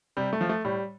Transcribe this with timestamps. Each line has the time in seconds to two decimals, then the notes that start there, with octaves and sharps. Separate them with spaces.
0.17 C3 G3
0.33 A3
0.41 F3
0.49 A3
0.65 A2 G3